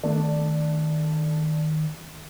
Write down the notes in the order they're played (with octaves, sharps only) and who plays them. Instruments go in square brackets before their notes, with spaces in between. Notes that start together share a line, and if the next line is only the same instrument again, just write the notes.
[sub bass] D#3 [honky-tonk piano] A3 D4